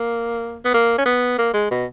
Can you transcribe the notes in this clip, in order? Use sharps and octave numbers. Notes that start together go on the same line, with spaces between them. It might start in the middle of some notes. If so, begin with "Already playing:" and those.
Already playing: A#3
B3
A#3
C#4
B3
A#3
G#3
B2